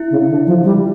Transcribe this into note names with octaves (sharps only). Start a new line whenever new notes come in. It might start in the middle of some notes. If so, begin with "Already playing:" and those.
Already playing: E4
C#3
D3
F3
G3